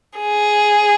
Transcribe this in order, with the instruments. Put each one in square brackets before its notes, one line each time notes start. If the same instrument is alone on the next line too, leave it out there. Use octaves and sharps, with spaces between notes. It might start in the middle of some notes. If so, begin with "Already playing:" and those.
[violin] G#4